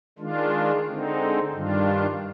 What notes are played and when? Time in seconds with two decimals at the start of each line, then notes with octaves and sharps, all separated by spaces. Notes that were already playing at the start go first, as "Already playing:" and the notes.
0.19 D#3 G#3 D4 F4
0.86 D3 G#3 C4 D#4
1.53 G2 D#3 G3 D4 F4